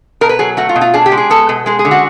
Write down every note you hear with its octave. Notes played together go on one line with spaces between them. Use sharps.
B2 A#4
B4
F#3 G#4
A3 F#4
F4
B2
F4
D4 G#4
G4
G#3
G#4
B3 A4
B2
G#3 G#4
G#4
D3
F#4